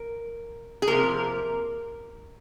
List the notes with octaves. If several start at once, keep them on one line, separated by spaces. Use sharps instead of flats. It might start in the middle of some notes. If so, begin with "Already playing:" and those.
Already playing: A#4
G#4
C3 F3 A#3 A#4